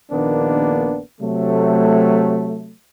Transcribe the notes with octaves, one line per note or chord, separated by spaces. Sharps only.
A#1 D#3 A#3 B3 D4
C3 F#3 A3